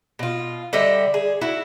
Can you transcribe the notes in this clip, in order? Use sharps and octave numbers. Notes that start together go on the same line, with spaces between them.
B2 F4
D3 G3 D#5 E5
G#4
E4 F#4